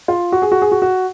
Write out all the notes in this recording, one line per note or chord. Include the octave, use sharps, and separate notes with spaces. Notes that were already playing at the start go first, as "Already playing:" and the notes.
F4
F#4
G#4
F#4
G#4
F#4
F#4